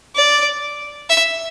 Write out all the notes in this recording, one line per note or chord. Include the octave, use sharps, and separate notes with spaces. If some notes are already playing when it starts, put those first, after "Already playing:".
D5
E5